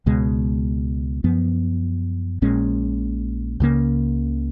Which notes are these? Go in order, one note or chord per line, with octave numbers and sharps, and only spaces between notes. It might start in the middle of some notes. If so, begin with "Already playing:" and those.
C#2 B2 G#3
F#2 F3 B3
A#1 A#2 G#3 C#4
C#2 C#3 F3 A#3